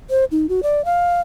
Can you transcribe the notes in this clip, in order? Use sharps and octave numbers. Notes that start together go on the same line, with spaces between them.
C5
D#4
F#4
D5
F5